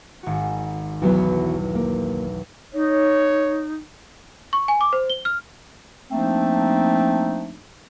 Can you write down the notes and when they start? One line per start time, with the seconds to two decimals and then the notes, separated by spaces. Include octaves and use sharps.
0.23 G#1 F#4
1.02 B1 E2 E3 F#3 B3
1.75 A#3
2.74 D#4 C#5
4.53 C#6
4.68 G#5
4.81 D6
4.93 C5
5.10 G7
5.25 F6
6.11 F3 A3 A#3 C4 D4 D#4